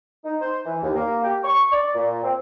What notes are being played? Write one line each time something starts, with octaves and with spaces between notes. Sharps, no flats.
D#4
C5
E3
D#2
A#3
G4
C#6
D5
A#2
C4